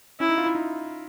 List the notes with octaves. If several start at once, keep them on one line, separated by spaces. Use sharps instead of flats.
C#4 E4
D#4
F4
E4
D#4